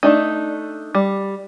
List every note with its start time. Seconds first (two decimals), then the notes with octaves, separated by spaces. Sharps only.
0.03 A3 D4 D#4
0.95 G3